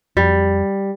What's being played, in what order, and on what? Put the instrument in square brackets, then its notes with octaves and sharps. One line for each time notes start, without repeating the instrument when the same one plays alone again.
[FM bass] F2 [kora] G3